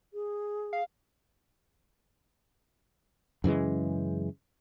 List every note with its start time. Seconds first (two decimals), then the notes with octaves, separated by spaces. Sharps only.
0.13 G#4
0.73 F5
3.44 F#2 C#3 E3 G#3